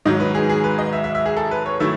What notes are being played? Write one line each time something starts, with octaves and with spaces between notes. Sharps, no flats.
G#2 D#3 F#3 D#5
B4
G#4
G#4
B4
D#5
E5
E5
E5
G#4
A4
B4
C#5
D#3 F#3 A3 E4 E5